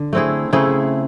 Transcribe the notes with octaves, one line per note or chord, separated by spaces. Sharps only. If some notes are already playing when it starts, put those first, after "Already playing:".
Already playing: D3
A3 C4 E4 G#4
C#3 A3 C4 E4 G#4